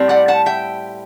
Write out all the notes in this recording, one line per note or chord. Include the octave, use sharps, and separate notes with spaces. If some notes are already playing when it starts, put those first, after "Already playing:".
Already playing: A2 G3 C4
D5 F#5
F#5 A5
E5 G5